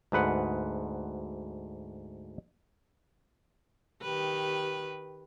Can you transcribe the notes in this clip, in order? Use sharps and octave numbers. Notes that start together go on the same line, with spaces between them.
D2 G#2 B4 F#5
D#3 G4 B4